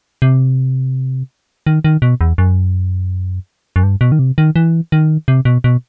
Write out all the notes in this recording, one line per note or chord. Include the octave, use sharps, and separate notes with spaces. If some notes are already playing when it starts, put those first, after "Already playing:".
C3
D#3
D#3
B2
E2
F#2
F#2
G2
B2
D#3
C3
D#3
E3
D#3
C3
B2
B2